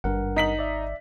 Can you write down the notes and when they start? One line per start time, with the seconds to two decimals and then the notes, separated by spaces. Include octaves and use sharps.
0.04 G#1 G2 A#4 F#5
0.36 D#4 B6 F#7
0.59 D5 E5